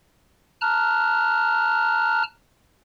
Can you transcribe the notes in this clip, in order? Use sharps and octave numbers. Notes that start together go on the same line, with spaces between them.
A5 A#5 F6 F#6